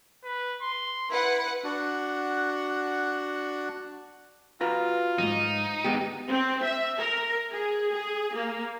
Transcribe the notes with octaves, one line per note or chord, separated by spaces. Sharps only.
B4
C6
E4 B4 F#5
D4 F#4 F#5
F4 F#4 B4 A#5
F2 G#2 D#4
G#3 B3 G4
C4
E5
A#4
G#4
G#4
A#3